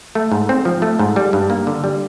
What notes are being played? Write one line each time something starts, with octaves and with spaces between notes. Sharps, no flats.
A3
G#2
C4
F3
A3
G#2
G3
G2
A#3
D3
G3